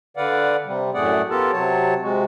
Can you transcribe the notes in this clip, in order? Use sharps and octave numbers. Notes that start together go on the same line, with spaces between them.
D3 B4 D5 F5 F#5
C3 G3
F#2 A2 A3 G#4 D5 F#5
B3 F4 G4 A4 A#4 A5
C3 F#3 C#5 A5
C3 G#3 F#4